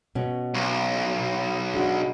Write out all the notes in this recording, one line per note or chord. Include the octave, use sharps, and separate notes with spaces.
B2 C#4
B1
G#3 D4 F#4